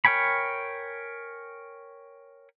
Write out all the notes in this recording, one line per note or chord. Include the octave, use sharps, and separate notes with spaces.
A#4 C#5 G5 G#5 B5